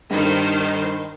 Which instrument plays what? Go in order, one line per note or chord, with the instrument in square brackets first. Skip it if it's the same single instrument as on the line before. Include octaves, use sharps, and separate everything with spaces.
[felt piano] G2 [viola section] D#3 C5